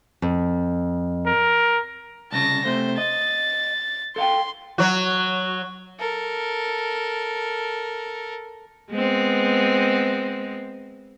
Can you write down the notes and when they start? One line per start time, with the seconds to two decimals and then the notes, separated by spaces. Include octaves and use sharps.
0.22 F2
1.26 A#4
2.32 C2 C#3 A5 A#6
2.65 C3 A3 C5
2.98 D#5 A6
4.16 A4 F5 G5 C6
4.78 F#3 F#4
6.00 A4 A#4
8.91 G#3 B3 C4